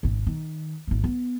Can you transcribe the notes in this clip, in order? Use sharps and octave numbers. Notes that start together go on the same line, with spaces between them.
G#1 C#3
D#3
G#1 A3
B3